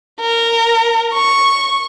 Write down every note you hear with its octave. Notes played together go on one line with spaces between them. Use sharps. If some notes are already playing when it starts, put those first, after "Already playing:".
A#4
C#6